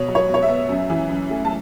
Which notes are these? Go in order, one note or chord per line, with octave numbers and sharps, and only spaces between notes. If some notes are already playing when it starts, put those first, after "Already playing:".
Already playing: B2 C#5
F#3
C#5
B2
C#5
E5
B3
F#2
E3
F#2
A3
A5